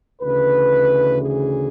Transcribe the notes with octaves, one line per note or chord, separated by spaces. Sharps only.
D2 C#3 E3 B4
G#4